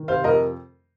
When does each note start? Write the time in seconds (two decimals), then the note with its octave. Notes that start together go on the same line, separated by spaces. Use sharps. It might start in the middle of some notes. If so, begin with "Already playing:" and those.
Already playing: D#3
0.08 C3 C5 F5
0.24 F2 A#4 D#5